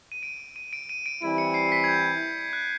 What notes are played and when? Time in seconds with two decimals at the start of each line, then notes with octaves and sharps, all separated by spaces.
0.12 D#7
0.23 D7
0.56 D#7
0.73 D7
0.89 D#7
1.06 D7
1.22 E3 G3 C4 E4 D7
1.38 C#7
1.54 C7
1.72 B6
1.84 G#6
1.88 G6
2.53 F#6